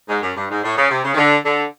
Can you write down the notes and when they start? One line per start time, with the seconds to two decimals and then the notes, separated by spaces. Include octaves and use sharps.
0.08 G#2
0.22 F#2
0.36 G2
0.50 G#2
0.63 A2
0.77 C#3
0.90 C3
1.04 C#3
1.13 D#3
1.17 D3
1.44 D3